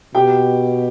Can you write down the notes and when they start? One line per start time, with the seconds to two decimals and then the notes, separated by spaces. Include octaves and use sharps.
0.15 B2 G4 G5